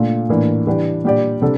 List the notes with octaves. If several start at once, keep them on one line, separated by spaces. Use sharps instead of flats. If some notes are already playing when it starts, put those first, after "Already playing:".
Already playing: A#2 A3 D4 F4
A2 E3 A#3 D4
E3 G3 D4 G4
A#2 G3 D4 G4 D5
C3 G3 D4 A4 D5